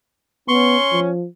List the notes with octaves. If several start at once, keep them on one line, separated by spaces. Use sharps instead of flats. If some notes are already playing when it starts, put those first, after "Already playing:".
B3 C#4 C6 C#6
F3